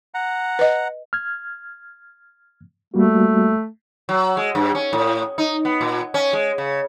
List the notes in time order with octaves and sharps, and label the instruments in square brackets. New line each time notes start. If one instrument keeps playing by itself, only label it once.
[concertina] F#5 A#5
[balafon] B4 D#5
[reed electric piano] F6 G#6
[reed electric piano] G3 A#3 F#4 [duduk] A3
[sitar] F#3
G#3
G2
C#4
A2
D#4
B3
A#2
C#4
G#3
C#3